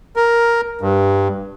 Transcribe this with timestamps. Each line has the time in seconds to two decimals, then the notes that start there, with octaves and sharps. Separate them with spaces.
0.16 A#4
0.81 G2